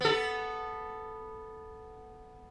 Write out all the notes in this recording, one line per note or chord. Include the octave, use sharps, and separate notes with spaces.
B3 A4